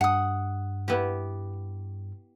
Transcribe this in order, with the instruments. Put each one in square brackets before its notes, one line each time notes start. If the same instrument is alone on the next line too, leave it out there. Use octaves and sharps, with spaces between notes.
[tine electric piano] G2 [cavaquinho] F#5 D#6
[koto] B3 E4 G4